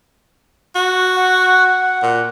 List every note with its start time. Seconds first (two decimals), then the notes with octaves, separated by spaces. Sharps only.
0.75 F#4
1.17 F#5
2.03 A#2